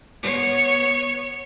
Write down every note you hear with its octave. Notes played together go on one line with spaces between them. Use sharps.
B3 C#5